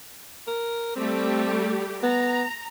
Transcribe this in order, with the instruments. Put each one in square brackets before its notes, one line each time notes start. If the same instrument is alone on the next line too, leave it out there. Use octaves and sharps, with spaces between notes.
[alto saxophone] A#4
[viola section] G3 A3 G4 [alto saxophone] C4
[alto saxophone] B3 [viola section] A#5